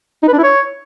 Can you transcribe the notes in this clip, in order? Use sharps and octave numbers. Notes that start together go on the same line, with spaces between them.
D#4
B4
D4
E4
C#5